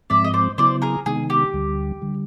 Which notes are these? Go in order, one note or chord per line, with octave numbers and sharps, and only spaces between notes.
G#2 F3 G#3 C4 D5 E5
D#5
C5 D5
C#3 F#3 B3 E4 C5 D5
G#4 A#4
C3 D#3 G#3 B3 D#4 G#4
G4
D2 D3 G3
D3 G3